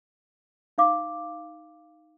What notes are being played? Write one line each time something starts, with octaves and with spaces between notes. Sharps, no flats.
D#4 F5 D6